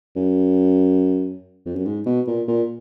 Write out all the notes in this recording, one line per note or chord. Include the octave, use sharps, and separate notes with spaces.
F#2
F2
F#2
G#2
B2
A#2
A#2